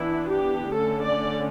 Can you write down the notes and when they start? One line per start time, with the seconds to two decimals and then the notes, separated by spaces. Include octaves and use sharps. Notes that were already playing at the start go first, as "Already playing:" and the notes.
Already playing: E3 B3 D4 E4
0.31 G4
0.75 D3 A3 C#4 A4
1.04 D5